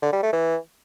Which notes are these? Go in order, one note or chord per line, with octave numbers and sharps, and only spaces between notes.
D3
G3
A3
E3